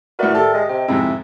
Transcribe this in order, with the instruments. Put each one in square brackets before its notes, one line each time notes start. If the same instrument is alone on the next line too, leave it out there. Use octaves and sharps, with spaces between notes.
[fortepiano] A2 B4 [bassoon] F#4 [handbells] A#4 D5 E5
[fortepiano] G4 [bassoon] A4
[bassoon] G#3 [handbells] D#5
[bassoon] C3 [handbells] G5
[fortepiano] F2 G#2 C3 [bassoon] E4